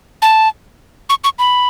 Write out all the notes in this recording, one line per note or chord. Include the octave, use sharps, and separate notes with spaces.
A5
C#6
C#6
B5